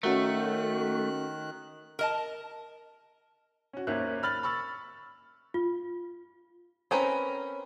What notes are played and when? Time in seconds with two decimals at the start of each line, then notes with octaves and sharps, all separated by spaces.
0.03 D#3 A3 C#4 F#4 A#4 F#6
1.99 A#4 D#5 A5
3.73 C#4 F#4
3.87 G#1 D#2 A#3 C#4 E5 F#6
4.23 B5 F6 A6 F#7
4.43 B5 C#6 E6 A6
5.54 F4
6.91 C4 C#4 A#4 B4